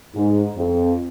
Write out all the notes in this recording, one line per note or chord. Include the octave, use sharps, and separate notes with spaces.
G#2
F2